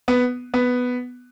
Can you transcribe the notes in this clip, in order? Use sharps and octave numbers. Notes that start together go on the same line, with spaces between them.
B3
B3